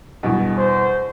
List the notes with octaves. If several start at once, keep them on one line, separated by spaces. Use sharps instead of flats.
E2 G2 B2
C5